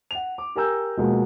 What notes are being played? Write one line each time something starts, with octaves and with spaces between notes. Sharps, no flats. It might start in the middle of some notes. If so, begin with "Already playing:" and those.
F#5 F7
D6
G4 A#4 G#5 A#5 E6 G6
B2 F3 G#3 A#3